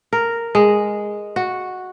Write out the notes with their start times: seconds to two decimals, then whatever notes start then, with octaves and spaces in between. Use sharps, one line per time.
0.13 A#4
0.55 G#3
1.36 F#4